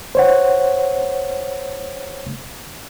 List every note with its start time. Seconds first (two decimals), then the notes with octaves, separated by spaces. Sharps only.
0.15 C5 C#5 F#5